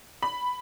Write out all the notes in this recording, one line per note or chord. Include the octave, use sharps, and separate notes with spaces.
B5